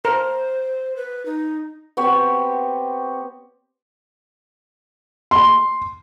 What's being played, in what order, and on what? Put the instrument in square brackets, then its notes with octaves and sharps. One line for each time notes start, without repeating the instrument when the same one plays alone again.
[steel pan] A#4 [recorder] C5
[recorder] B4
D#4
[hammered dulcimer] B3 C4 G4 C#5
[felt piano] C6